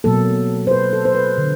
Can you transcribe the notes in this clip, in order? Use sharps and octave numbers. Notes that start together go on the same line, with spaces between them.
B2 F#3 A#3 A4
C5
B4
A4
C5
B4
D3 F3